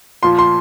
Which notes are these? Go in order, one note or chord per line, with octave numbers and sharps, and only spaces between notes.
A#2 F3 C6
C6